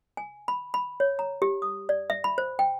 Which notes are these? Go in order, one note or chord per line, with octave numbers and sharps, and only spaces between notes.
G#5
B5
B5
C#5
A#5
G4
D#6
D5
E5
B5
C5
G5